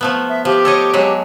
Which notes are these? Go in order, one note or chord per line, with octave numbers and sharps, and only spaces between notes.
F3 A3 B3
E5
F3 G4
A4 C#5 D#5
F#3 G#3 A4